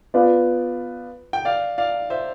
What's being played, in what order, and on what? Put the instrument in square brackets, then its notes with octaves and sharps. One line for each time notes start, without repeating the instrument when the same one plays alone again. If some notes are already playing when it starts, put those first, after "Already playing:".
[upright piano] B3 F4 B4 D5
[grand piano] G5
D5 F5
D5 F5
C5 E5